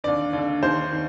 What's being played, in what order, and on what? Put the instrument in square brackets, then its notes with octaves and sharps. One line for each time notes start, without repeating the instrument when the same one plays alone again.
[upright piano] D#2 D3 D5
D#2 D3
D#2 D#3 C5
D#3